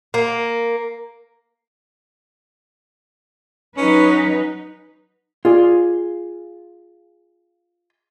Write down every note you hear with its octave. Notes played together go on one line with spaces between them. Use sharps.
A#3
F#3 C#4 D#4 B4
F4 G#4 D5